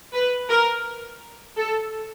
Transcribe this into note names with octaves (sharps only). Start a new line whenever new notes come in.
B4
A#4
A4